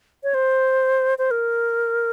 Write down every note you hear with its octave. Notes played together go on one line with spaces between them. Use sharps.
C#5
C5
C5
A#4